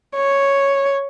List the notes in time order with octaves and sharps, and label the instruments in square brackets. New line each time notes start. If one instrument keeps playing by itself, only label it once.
[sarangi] C#5